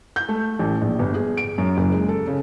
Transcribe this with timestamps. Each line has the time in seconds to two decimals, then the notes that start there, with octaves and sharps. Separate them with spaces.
0.16 G6
0.29 A3
0.59 A1
0.82 A#1
0.99 G1
1.14 G#4
1.37 D7
1.58 F#2
1.77 F#1
1.92 G#3
2.09 A4
2.27 C#3